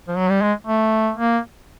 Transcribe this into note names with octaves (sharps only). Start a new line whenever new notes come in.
F3
F#3
G3
G#3
A3
A#3